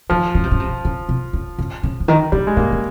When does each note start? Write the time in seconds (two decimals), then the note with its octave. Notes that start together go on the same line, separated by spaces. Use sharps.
0.10 D#3 F3
0.35 C#3
0.44 C3
0.52 C#3
0.60 C3
0.85 C#3
1.09 C3
1.33 C#3
1.58 C#3
1.83 C#3
2.00 C#3
2.08 D#3
2.32 C#3 G3
2.47 G#3
2.57 C#3 A#3
2.72 C#3